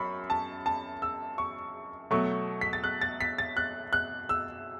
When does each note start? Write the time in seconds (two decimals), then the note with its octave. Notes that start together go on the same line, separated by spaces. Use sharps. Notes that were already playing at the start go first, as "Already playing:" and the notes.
Already playing: F#2 B5 C#6
0.30 A5
0.66 A5
1.02 E6
1.38 C#6
2.11 B2 F#3 A3 C#6
2.61 B6
2.73 A6
2.84 F#6
3.01 A6
3.21 B6
3.38 A6
3.57 F#6
3.93 F#6
4.29 E6